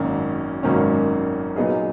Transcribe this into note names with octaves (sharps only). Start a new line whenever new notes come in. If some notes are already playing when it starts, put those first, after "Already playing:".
Already playing: G#1 F#2 D#3 A#3 C#4
G#1 F#2 D#3 A#3 C#4
A#2 F#3 B3 D#4 G#4